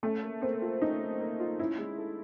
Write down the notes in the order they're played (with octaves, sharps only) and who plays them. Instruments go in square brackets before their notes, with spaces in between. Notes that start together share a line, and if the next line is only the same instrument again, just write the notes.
[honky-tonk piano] A3 [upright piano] C#4
[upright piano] A#3
[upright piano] A#3 [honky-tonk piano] C4
[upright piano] F4
[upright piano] C#4 [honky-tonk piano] D#4
[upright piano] A#3
A#3
F4
[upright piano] C#4 [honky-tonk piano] E4
[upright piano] G#3
A4